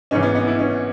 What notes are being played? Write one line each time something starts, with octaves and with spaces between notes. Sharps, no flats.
G#1 G#2 E3 C#4
B3
B3
E4
C#4